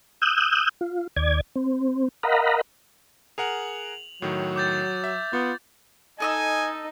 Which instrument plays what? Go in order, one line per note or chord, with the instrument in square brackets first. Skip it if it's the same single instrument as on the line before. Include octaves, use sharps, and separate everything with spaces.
[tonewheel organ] D#6 E6 F#6 G6
F4
D#2 D5 G#6
C4
A#4 D#5 F5 F#5 A#5 B5
[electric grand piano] G#4 A#4 F#5 [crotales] F7 F#7
[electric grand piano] A2 D#3 [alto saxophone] F#3
[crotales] D6 G6 A6
[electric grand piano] E5
[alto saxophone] B3 [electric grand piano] F4
[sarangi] D#4 [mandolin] A4 D#5 E6 [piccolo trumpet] G#5